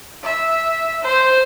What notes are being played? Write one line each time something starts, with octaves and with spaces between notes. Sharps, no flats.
E5
C5